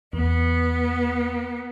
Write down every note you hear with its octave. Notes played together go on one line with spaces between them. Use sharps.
E2 B3